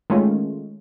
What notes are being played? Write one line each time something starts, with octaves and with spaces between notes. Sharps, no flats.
D#3 G#3 A3 C#4 F4